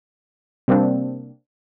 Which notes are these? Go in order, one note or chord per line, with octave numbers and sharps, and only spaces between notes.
C3 G3 A#3 C4 D4